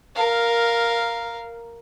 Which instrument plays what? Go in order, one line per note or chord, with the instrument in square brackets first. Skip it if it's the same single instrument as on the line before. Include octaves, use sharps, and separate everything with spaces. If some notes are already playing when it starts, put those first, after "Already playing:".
[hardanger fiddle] A#4 F5